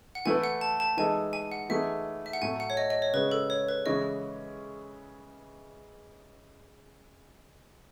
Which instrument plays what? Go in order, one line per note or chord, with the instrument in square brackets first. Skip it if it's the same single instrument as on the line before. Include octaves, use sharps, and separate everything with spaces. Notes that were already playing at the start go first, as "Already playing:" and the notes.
[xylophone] F#5
[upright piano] E3 A3 E4 B4 [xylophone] G#5
[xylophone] F#5
A5
A5
[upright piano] E3 G#3 D#4 A4 [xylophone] G#5
[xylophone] G#5
F#5
[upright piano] E3 A3 D#4 G#4 [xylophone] E5
[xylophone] E5
F#5
[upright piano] A2 F#3 A3 [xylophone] G#5
[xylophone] F#5
C#5
D#5
D#5
C#5
[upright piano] C#3 G#3 C#4 [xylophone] B4
[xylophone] A4
C#5
B4
[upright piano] C#3 E3 G#3 C#4 [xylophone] D#5